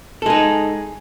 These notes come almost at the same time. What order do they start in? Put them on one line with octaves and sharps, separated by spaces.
A4 G#3 D#4